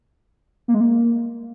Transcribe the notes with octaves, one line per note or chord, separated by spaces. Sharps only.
A#3
G#3
A#3